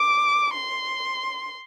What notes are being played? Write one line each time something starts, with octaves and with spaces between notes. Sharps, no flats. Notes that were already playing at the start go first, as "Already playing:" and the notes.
Already playing: D6
C6